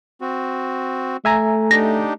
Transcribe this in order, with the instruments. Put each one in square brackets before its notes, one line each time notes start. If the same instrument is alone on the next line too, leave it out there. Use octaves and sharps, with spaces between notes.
[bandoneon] C4 F#4
[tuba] A3 [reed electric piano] E5 G#5 A#5
[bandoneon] D4 D#4 G4 [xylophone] A#6